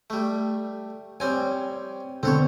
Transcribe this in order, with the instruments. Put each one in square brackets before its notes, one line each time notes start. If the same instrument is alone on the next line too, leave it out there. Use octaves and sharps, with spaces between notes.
[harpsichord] G3 A3
[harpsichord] G3 C4 G#5 [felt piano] C#5
[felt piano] D3 B3 [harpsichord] C4 A4 C#5